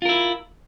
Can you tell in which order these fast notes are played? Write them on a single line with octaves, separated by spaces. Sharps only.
F4 A#4 E4